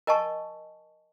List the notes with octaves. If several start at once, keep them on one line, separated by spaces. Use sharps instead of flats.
A#4 D#5 G#5 A5 C#6